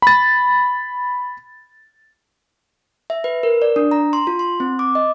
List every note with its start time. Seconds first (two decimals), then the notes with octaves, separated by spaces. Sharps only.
0.02 B5 A6
3.10 E5
3.24 B4
3.43 A#4
3.62 D5
3.76 D4
3.91 A#5
4.13 C6
4.27 F4
4.39 C6
4.60 C4
4.79 D6
4.95 D#5